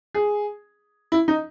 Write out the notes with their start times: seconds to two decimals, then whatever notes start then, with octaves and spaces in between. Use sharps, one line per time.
0.14 G#4
1.12 E4
1.28 D#4